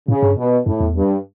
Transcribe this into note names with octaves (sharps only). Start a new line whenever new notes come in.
A2 C#3
G2
B2
F#2 A2
E2
G2